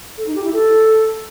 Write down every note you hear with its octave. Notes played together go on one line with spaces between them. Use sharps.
A4
D#4
G4
E4
A4